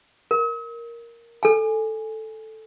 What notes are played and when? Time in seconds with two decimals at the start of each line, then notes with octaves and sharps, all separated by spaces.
0.31 A#4
1.43 A4 G#5